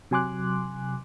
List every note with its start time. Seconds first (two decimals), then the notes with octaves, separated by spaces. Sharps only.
0.11 C3 F#3 G#5 C6 D6 F#6